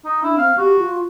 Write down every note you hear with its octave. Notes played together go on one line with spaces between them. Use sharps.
D#4
D4 E4
C4 F5
F#4 G4
F4